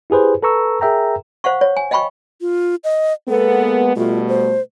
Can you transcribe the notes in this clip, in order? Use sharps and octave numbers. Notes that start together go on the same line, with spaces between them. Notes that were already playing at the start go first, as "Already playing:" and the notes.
E4 G4 G#4 B4 C5
A4 B4 A#5 C#6 E6
G#4 A#4 E5 G5 A#5
C5 F5 F#5 C#6
C#5
G#5
D#5 F5 G5 B5 C#6
F4
D#5
G#3 A#3 B3 A4
B2 G3 A3 F4
C5